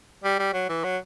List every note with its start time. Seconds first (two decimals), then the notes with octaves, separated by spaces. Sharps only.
0.24 G3
0.39 G3
0.53 F#3
0.69 E3
0.84 F#3